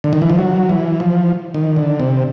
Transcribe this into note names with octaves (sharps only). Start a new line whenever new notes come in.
D3
D#3
E3
F3
F#3
E3
F3
D#3
D3
C3